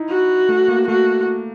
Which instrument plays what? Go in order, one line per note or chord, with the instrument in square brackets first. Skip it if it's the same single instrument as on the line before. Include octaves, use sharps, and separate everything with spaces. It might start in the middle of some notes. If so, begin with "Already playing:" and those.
Already playing: [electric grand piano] D#4 E4
[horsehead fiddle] F#4
[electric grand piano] A3
A#3
[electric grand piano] A3 [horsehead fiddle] F#4